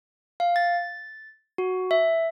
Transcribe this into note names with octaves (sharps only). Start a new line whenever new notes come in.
F5
A6
F#4
E5